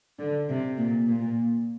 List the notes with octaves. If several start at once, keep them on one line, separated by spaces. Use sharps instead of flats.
D3
C3
A#2
A#2